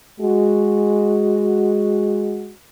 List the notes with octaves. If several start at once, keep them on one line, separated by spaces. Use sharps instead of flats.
G#3 F#4